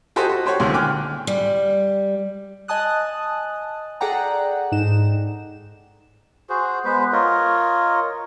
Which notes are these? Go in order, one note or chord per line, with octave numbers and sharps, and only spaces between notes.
F#4 G4 A4 C5 D#5 G#5
F#4
G4 C5 C#5 F#5
C#2 A#2 D3 D#3
G5 G#5 D6 F6 F#6
G3
D#5 G#5 A5 D#6 F#6
G#4 A4 D5 F#5 G5 A#5
G#2 D#4 E7
F#4 G#4 C5
G#3 B3 B4 C5
F4 A#4 C#5 D#5